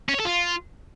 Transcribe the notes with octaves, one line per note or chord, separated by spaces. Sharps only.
C#4
C#5
A4
F4